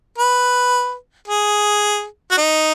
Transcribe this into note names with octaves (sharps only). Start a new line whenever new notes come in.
B4
G#4
F#4
D#4